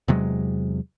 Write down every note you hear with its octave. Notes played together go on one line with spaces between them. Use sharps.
E2 C3 F#3 G#3